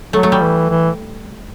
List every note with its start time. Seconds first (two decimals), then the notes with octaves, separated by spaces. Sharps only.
0.13 F#3 A3
0.23 A3
0.32 G3
0.42 E3
0.69 E3